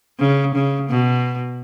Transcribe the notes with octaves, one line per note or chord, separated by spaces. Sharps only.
C#3
C#3
B2